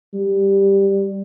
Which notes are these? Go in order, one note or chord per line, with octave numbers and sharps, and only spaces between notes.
G3